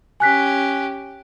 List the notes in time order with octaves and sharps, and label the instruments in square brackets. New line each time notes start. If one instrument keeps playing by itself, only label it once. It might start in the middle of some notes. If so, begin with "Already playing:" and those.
[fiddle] C#4 G4 [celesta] G#5 F#6 B6